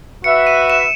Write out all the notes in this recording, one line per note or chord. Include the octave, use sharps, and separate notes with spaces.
F#4 B4 E5 C#7
D#7
E7